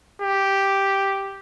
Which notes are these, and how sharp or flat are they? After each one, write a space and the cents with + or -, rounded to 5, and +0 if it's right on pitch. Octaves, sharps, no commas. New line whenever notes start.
G4 +0